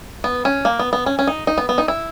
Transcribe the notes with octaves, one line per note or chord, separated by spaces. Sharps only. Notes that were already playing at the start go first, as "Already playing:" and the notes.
B3
C#4
A#3
B3
B3
C#4
C#4
D#4
D#4
B3
B3
D#4
E4